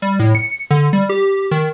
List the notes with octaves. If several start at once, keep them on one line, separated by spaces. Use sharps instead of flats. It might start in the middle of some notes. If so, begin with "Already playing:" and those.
G3
A2
C#7
D3
G3
G4
D#3